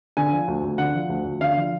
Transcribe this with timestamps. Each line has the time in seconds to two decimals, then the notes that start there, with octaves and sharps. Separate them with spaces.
0.17 D3 G#5
0.32 F3
0.48 D2
0.64 D2
0.78 D3 F#5
0.94 F3
1.09 D2
1.25 D2
1.40 D3 F5
1.57 F3